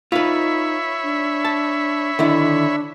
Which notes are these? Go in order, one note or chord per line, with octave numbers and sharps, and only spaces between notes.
D#4 F4 B4 C#5 E5 B5
D4
A5
D3 D#3 D4 E4